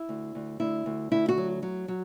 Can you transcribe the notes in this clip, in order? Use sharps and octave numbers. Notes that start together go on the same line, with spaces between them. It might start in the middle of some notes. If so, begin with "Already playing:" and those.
Already playing: E4
D2
D2
D2 E4
D2
D2 E4
F#4
F#3
F#3
F#3